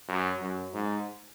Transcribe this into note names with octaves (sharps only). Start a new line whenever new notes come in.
F#2
F#2
G#2